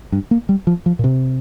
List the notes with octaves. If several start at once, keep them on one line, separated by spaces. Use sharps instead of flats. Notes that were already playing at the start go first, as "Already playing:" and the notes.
G2
A#3
G3
F3
F3
A#2
C3